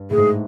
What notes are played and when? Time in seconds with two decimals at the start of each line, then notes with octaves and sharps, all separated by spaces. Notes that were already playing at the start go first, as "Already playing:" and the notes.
Already playing: G2
0.11 A2 G#4
0.18 G#2